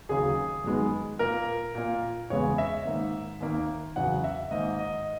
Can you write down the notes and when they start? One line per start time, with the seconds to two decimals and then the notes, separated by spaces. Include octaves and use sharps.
0.09 D#2 C#3 F#3 G#4
0.64 F#2 D#3 G#3 B3
1.19 A#2 A#3 A#4
1.75 A#2 A#3
2.30 E2 C#3 G#3 B3 C#5
2.58 E5
2.85 G#2 D#3 A#3
3.40 D#2 D#3 A#3
3.96 E2 C#3 F#3 F#5
4.24 E5
4.51 G#2 D#3 A#3 D#5
4.79 D#5